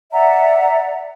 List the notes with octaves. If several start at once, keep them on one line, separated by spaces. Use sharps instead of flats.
D5 E5 F#5 A#5